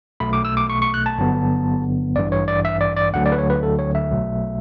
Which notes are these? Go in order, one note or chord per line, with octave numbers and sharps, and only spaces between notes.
B1 B2 A3 B5
D6
E6
D6
C#6
C#6
F#6
A5
G1 G2 D3 F#3 B3
A1 G2 E3 D5
C#5
D5
E5
D5
D5
D2 D3 F#3 A3 F#5
D5
B4
C#5
B4
A4
C#5
E5
B1 B2 F#3 A3